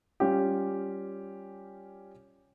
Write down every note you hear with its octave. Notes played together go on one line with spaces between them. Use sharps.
G3 C#4 F4 G4